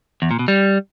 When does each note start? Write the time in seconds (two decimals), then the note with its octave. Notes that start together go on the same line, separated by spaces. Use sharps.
0.22 E2
0.31 A#2
0.39 B2
0.48 G3